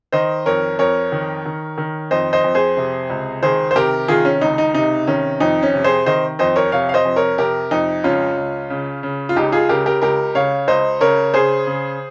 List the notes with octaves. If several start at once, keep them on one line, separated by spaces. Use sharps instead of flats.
D#3 C5 D#5
F2 A#4 C#5
F2 A#4 C#5
D#3
D#3
D#3
F2 C5 D#5
C5 D#5
F2
G#4 C5
C3
C#2
D#3 G#4 C5
C5
C3 G4 A#4
D#3 F4 G#4
C#4
C#2 D#4
D#4
C3 D#4
D#3 C#4
F2 D#4
C#4
C3
G#4 C5
D#3 C5 D#5
F2 C5 D#5
A#4 C#5
C3 C#5 F5
F5
C5 D#5
F2
A#4 C#5
C3 G4 A#4
F2 D#4
C#2 C#4 F4
C#2
C#3
C#3
F4
C#2 D#4 G4
F4 G#4
C#3 G4 A#4
G4 A#4
C#2 G4 A#4
C#3 C#5 F5
C#2 C5 D#5
C#3 A#4 C#5
C#3 G#4 C5
C#3